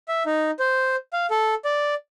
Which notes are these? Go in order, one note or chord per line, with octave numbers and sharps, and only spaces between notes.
E5
D#4
C5
F5
A4
D5